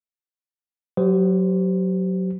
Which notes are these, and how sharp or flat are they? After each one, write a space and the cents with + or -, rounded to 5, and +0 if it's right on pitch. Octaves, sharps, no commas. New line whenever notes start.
F#3 +0 G4 -30 C5 -35